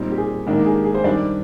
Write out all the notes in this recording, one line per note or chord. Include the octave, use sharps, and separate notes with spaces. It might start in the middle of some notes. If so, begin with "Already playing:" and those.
Already playing: A#2 G3 C4 D#4
G4
G#4
G#2 D#3 A#3 D4
G#4
G4
G#4
C5
G2 D#3 G3 D4 D5